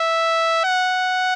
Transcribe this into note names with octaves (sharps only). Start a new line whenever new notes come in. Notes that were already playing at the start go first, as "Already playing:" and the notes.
Already playing: E5
F#5